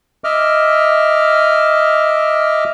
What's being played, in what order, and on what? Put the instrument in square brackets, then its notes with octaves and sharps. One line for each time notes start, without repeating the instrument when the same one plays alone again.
[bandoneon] D#5 E5 D6 F6